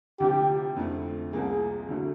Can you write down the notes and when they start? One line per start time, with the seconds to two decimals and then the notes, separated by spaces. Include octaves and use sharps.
0.20 D2 C3 F3 G4
0.76 F2 D3 F3 A3
1.33 C2 C3 F3 A#3 G#4
1.88 D2 D3 F#3 A3